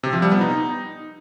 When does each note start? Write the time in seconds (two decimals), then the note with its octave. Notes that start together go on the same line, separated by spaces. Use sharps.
0.03 C3
0.13 F3
0.22 G3
0.32 B3
0.41 D#4